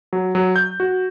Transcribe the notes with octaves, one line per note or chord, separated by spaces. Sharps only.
F#3
F#3
G6
F#4